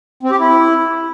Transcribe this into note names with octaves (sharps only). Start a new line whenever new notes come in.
C4
G4
E4